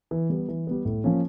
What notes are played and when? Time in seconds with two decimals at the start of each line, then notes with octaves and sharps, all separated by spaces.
0.11 E3
0.30 G3 B3
0.48 E3
0.67 G3 B3
0.85 A2
1.04 F3 A#3 C#4